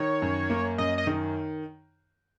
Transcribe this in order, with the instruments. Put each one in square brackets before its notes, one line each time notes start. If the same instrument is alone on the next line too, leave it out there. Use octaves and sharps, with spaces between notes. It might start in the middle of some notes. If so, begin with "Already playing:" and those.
Already playing: [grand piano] D#3 [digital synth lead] C#5
[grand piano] F#2
A#3
[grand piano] F#2 [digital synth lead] D#5
[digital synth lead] D#5
[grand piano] D#3